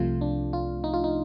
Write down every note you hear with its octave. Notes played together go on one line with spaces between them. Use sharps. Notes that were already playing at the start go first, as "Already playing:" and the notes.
Already playing: C2 C3 F3 A3 F4
D4
F4
D#4
F4
D#4